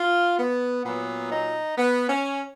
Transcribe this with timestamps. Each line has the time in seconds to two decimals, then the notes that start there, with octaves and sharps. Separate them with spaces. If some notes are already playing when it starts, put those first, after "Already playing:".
Already playing: F4
0.39 B3
0.85 A#2 F#3 B3
1.32 D#4
1.78 B3
2.09 C#4